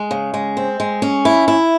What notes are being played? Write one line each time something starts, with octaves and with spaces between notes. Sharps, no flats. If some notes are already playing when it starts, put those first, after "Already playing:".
Already playing: G#3
C#3
G#3
C4
G#3
C#4
E4
E4